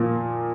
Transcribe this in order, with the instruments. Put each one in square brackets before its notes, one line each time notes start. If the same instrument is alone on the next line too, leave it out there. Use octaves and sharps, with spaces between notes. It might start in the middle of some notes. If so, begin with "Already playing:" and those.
Already playing: [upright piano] A#2 F3 A#3